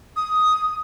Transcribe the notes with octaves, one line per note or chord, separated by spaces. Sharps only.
D#6